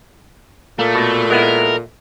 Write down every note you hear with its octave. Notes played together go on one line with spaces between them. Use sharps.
A#2 A3 A#3 A4
B2
G#3 B3 E4 A#4